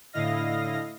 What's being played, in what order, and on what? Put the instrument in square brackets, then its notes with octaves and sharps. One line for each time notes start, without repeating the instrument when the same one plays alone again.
[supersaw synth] A2 D3 E4 D#5 F5 A#6